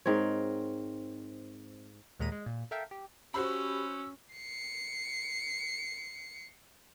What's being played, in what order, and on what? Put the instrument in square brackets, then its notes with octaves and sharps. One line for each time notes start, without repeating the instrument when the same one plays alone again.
[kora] G#2 C4 A#4 C#5
[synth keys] D#2 A#2 G#3 A#5 B5 D#7
G#3
A#2
A4 A#4 E5 F5 G5
G4
[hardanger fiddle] C#4 [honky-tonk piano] F#4 C5 B5 [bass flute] G4 [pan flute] E6
[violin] C7 C#7